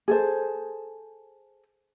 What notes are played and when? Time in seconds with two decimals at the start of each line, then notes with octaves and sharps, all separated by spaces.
0.08 G#4 A4 C5